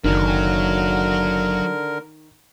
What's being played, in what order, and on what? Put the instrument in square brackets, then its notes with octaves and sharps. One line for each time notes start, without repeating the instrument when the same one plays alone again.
[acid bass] F#1 [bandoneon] D3 A#4 [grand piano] D#3 [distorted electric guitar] F#3